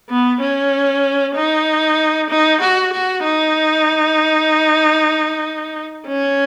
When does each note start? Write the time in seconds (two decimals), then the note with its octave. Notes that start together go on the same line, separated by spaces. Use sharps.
0.09 B3
0.41 C#4
1.36 D#4
2.30 D#4
2.61 F#4
2.93 F#4
3.24 D#4
6.07 C#4